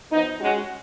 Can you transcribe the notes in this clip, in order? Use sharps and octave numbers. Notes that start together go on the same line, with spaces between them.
F3 B3 D#4
G#3 C#4 F#4